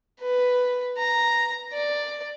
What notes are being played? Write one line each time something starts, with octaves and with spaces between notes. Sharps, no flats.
B4
A#5
D5